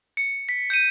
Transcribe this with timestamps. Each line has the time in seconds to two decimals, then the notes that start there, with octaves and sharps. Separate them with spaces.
0.17 C#7
0.49 B6
0.70 G6 C#7 D#7